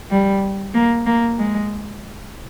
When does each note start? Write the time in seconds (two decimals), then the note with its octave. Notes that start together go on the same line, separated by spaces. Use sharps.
0.11 G3
0.74 A#3
1.06 A#3
1.38 G#3